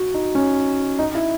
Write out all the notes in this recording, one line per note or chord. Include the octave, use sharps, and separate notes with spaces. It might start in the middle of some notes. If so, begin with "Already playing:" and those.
Already playing: F#4
D#4
C#4
D#4
E4